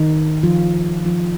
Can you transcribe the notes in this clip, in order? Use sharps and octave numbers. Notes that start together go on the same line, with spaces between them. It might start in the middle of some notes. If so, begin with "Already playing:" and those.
Already playing: D#3 D#4
F3 F4
F3 F4